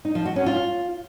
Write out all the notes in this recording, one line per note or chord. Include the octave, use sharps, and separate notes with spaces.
D#4
F3
F#4
C#4
F4